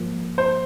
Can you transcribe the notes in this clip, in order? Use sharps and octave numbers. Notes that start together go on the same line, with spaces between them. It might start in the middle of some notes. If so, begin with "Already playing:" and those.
Already playing: G#2 F3 A#3
C5